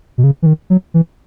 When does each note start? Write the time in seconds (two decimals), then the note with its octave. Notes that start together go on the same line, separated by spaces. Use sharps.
0.18 B2
0.24 C#3
0.42 E3
0.46 D#3
0.70 F#3
0.94 E3